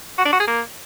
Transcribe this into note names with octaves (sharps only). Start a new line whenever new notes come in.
F#4
D4
F#4
G#4
A#3